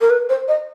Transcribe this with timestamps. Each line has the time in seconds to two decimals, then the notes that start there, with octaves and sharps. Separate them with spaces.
0.01 A#4
0.10 B4
0.29 C5
0.48 D#5